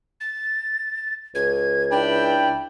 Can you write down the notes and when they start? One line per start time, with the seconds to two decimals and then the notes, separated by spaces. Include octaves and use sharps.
0.21 A6
1.35 C#2 G#6
1.91 D4 E4 G5 B5